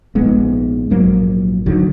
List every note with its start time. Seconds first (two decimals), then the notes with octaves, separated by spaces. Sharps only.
0.15 A#1 G#2 G#3 B3
0.90 A#1 G#2 F#3 A#3
1.66 D2 D3 D#3 F#3